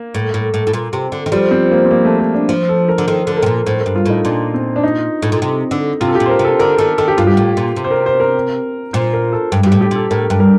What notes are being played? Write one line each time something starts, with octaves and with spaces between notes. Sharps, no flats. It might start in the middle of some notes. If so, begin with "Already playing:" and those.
Already playing: A#3
A2
A2
A2
A2
A#2
C3
D3
D#3
F3 G3
C4
A#3
C4
A#3
A3
A#3
D4
F3
A4
A#4
D3
D#3 C5
D3 A4
A#4
C3
A#2
A2 C5
A#4
G2
F4
A2 D#4
A#2 D4
C4
D4
D#4
A2
A#2
C3
D3
C3 F4
A4
A#2 G4
C5
A#4
C3
A4
D3 A#4
D#3 A4
D#3 A4
G4
G2 F4
G4
A2
A#2
C3
C5
A#4
C5
A#4
A#2 C5
A#4
A4
G2
G2
G4
A2
G4
A#2 A4
A2 A#4
G2
A#4